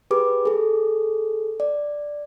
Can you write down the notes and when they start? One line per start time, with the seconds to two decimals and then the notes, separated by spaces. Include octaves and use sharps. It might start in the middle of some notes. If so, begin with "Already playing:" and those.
0.11 G4 G#4 B4 D6
0.45 G#4 A4
1.60 D5